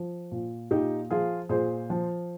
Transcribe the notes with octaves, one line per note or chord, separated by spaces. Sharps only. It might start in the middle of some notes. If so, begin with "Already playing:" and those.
Already playing: F3
A#2
A#2 D#4 G4
F3 F4 G#4
A#2 G#4 C5
F3